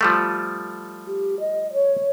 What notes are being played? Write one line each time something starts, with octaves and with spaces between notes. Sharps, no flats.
F3 G3 A3
G4
D#5
C#5